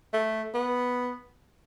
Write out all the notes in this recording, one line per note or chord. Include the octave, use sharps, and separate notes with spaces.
A3
B3